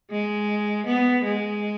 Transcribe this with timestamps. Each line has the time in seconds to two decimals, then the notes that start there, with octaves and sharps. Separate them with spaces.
0.11 G#3
0.87 B3
1.24 G#3